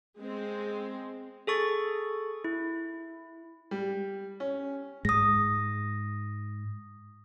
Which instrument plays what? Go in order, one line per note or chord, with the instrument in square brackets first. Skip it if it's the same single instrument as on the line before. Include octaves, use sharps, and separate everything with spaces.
[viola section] G#3 C4
[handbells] G#4 A4 C#6 A6
E4
[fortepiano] G3
C#4
[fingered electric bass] G#2 G#3 [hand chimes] D#6 A#6